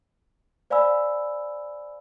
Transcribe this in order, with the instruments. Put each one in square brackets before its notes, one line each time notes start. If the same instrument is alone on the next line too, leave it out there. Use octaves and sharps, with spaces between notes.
[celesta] C5 D5 F5 G#5 B5 E6